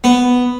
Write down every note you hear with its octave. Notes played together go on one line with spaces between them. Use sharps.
B3